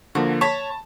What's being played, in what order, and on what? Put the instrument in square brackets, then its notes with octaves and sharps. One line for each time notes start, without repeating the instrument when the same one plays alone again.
[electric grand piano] D3 F3 A#3 [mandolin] F#4
[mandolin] C#5 B5 [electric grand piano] A5